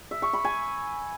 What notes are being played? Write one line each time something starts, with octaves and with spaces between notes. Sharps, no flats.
E5
C#6
B5
G#5